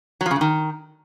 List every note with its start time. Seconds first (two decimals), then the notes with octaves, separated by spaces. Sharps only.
0.21 F#3
0.26 F3
0.31 C#3
0.36 G2
0.41 D#3